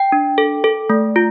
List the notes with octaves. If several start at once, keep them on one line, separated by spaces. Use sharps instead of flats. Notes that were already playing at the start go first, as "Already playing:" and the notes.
Already playing: G5
D4
A4
A4
A3
F4